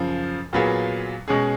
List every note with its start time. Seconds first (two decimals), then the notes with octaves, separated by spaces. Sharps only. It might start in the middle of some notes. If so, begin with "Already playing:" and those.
Already playing: F#2 C#3 F3
0.53 A#2 F#3 B3 F4 G#4
1.28 B2 G#3 C#4 G#4